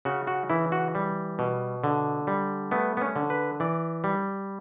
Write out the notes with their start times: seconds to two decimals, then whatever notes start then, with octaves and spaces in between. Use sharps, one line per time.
0.05 C#3 F#4
0.27 F#4
0.50 E3 E4
0.72 F#4
0.95 G3
1.39 B2
1.84 D3
2.27 G3
2.71 A3 B3
2.97 B3
3.01 C#4
3.16 D3
3.30 B4
3.60 E3 D5
4.04 G3